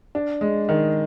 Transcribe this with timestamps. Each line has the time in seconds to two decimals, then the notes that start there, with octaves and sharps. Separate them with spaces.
0.15 D4
0.41 G#3
0.69 D#3